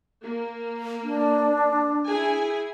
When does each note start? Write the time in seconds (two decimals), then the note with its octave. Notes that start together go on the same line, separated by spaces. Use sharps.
0.23 A#3
1.04 D4
2.06 E4 G#4 G#5